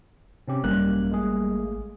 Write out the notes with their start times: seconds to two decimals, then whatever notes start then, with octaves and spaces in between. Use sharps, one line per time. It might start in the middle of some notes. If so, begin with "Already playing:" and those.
0.48 C3 C4 C#4 G4
0.64 G#1 F#2 G3 A#3 F#6
1.11 G#3 A3 G#4